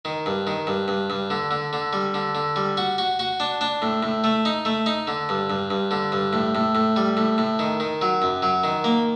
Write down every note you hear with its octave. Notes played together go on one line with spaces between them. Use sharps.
D#3
G2
D#3
G2
G2
G2
D3
D3
D3
G3
D3
D3
G3
F#4
F#4
F#4
D4
D4
A2
A2
A3
D#4
A3
D#4
D3
G2
G2
G2
D3
G2
A2
A2
A2
G3
A2
A2
D#3
D#3
F#3
F#2
F#3
D#3
A#3